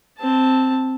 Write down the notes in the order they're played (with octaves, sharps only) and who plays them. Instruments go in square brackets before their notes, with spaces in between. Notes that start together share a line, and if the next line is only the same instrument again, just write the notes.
[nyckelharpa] C4 A5